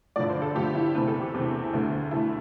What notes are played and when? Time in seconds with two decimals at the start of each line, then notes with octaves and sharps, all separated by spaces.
0.16 G2 D3 F3 A3 D5
0.29 C5
0.42 A4
0.55 G2 D3 F3 A3 G4
0.75 E4
0.95 E2 C3 E3 A3 B4
1.08 A4
1.20 G4
1.34 E2 C3 E3 A3
1.73 D2 D3 A3
2.11 D2 D3 A3 E4